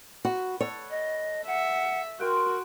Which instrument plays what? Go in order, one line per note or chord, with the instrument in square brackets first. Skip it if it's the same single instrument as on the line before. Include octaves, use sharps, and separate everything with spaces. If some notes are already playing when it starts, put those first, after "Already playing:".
[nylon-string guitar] F#4 [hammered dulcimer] B4
[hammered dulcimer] A4 [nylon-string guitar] C#5
[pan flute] D#5
[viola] E5 [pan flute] F#5
[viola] F#4 [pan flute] A#4 [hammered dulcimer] F#5 G5 C6